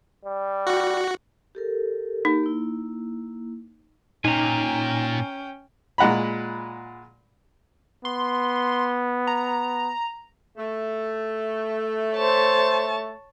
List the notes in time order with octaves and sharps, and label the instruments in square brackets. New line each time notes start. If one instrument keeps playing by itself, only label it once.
[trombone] G3
[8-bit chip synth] F#4
[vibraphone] G4 A4 A#4
[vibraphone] A#3 G4 A#4 [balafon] D#4
[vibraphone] A#3 E4
[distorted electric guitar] A#2 [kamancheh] C#4 G5 [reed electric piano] D#4 [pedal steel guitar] G#5 A#5
[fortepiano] A#2 G#3 F#5 A#5 B5
[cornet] B3 [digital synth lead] C6
[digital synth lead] A#5
[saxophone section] A3
[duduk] C5 [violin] C#5 A5